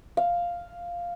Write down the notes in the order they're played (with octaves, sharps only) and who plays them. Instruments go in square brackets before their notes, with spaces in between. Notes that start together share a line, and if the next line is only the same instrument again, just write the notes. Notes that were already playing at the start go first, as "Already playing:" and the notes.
[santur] F5